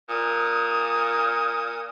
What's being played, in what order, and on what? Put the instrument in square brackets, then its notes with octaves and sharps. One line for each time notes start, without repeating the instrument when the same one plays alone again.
[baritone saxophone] A#2 [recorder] D#6